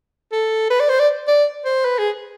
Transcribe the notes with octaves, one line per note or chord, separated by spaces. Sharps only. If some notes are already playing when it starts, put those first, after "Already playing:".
A4
B4
D5
C5
D5
D5
C5
B4
G#4